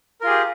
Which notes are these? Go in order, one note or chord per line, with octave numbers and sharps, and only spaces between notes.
F4 G4 G#4 A#4